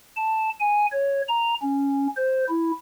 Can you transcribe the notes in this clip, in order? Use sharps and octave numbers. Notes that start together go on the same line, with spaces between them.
A5
G#5
C#5
A#5
C#4
C5
E4